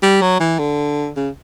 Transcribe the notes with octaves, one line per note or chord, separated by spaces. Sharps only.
G3
F#3
E3
D3
C#3